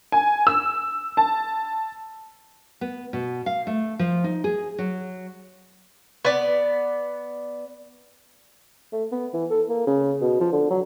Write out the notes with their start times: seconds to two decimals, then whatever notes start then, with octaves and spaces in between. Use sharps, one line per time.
0.12 G#5
0.47 E6
1.17 A5
2.81 B3
3.13 B2
3.46 F5
3.67 A3
3.99 F3
4.24 D#4
4.44 G#4
4.78 F#3
6.25 B3 D5
8.92 A3
9.12 B3
9.34 E3
9.50 A4
9.69 A#3
9.87 C#3
10.21 B2
10.40 F3
10.52 D3
10.70 F#3